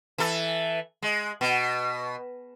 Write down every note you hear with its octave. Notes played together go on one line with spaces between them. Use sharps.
E3 A4
G#3
B2